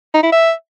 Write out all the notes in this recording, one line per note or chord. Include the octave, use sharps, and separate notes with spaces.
D#4
E4
E5